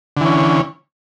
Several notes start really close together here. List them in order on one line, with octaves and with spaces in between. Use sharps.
D3 E3 C#4